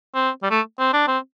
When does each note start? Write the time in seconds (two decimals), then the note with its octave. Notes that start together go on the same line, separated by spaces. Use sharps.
0.15 C4
0.43 G3
0.51 A3
0.79 C4
0.93 D4
1.08 C4